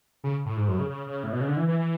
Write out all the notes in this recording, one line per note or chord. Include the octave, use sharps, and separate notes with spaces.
C#3
A2
G#2
F#2
C#3
C#3
C#3
A2
B2
C#3
D3
E3
E3
E3